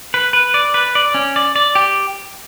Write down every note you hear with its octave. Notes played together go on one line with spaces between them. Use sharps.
B4
B4
D5
B4
D5
C#4
D5
D5
G4